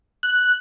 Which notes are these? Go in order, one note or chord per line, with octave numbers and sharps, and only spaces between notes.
F#6